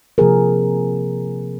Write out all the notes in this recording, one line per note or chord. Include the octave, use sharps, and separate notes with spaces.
C3 F3 A#3 G#4 A#4